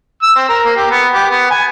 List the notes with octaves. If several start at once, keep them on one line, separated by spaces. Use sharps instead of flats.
E6
C4
A#4
A#3
G4
B3
G4
B3
G#5